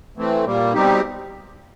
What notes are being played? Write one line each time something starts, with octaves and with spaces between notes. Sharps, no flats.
E3 A3 C4
A#2 G3 A#3
B2 G3 C4 D#4 G4